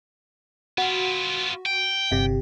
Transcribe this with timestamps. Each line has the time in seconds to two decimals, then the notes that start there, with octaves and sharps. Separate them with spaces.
0.78 B3 F4 F#4
1.66 G5
2.11 G1 C3 G4